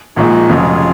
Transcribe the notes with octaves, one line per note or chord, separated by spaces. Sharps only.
A#1 A#2 F3 G#3 D#4 F#4
F1 F2 C#3 F#3 F4 G#4